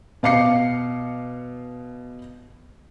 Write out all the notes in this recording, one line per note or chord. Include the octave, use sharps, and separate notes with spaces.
B2 F5 D6 C7 C#7